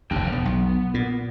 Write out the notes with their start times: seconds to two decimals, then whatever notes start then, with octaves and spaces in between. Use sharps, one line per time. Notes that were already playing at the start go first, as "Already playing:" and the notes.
0.11 F1 D#2 A#3 D4 G5
0.32 E1 B3
0.45 B1
0.94 A#2